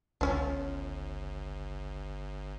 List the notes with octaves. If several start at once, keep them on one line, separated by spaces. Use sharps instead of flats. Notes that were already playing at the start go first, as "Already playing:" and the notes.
G1 C#2 F3 C#4 D4